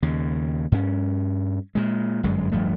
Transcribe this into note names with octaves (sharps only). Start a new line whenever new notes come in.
D#2 C#3
G2 C#4
A#2 G#3
G1 F#2 G#3
D1 G2 F3 A3